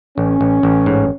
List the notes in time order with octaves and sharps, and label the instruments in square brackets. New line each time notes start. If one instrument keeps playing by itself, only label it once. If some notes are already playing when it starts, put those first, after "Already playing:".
[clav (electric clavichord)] A1 [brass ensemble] C#4
[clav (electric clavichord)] A1
A1
G#2